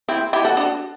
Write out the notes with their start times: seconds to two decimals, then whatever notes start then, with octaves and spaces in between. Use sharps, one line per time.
0.09 C4 E4
0.33 E4 G4
0.45 F#4 A4
0.57 D4 F#4